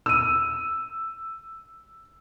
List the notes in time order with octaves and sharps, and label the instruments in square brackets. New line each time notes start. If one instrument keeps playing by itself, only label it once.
[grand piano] E6 D#7